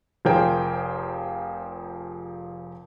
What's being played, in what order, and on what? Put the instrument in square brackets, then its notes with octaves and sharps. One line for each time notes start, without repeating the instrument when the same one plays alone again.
[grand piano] F1 F3 G#4 A#4 C5 G5